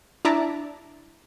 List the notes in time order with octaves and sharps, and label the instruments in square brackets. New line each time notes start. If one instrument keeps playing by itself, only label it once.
[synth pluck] D4 E4 E5 A5 A#5 D6